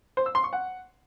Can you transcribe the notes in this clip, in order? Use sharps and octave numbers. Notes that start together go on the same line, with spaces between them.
C5
E6
C6
C#6
F#5